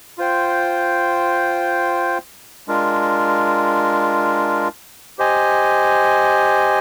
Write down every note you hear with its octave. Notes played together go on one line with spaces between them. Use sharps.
F4 C5 G5
G#3 D4 F4 A#4
G4 C5 D#5 G#5